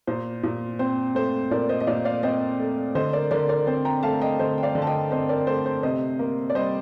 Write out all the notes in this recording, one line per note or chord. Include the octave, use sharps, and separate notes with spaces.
A#2 C5
A#2
C4 C5
A3 C5
A#2 A#4 D5
C5 D#5
D#5
A#2 D5 F5
D5 F5
C4 C5 D#5
A3
D3 C5 D#5
A#4 D5
D3 A#4 D5
A#4 D5
C4 C5
G5 A#5
A3 F5 A5
D#5 G5
D3 C5 D#5
G5
D5 F5
D3
A5
D#5 G5
C4 C5 D#5
A#4 D5
A3 C5
C5
C3 C5 D#5
A#3
D5
G3 C5 D#5